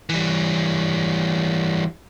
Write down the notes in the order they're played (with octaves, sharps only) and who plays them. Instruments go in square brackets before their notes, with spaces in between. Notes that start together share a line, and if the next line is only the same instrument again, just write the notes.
[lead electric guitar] E3 G3